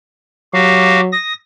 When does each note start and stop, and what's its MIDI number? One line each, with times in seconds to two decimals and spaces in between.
0.54 1.12 54
0.54 1.01 66
0.54 1.01 67
0.54 1.01 77
1.12 1.33 87
1.12 1.33 94